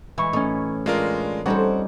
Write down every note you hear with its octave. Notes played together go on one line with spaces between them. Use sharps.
E3 G#3 E5 C#6
A2 C#4 D#4
G#3 D4 F4 A#4
G3 C4 C#4 D#4 F4 A4 F#5